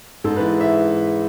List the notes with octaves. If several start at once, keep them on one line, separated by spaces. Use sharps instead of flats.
G#2 A4
E3 B4
E5